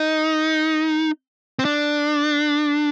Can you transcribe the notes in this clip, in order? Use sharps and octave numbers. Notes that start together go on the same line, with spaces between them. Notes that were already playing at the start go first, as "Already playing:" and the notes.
Already playing: D#4
C4
D4